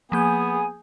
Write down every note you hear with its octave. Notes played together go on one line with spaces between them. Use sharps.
F3 A#3 B3 G#4 G#5 G6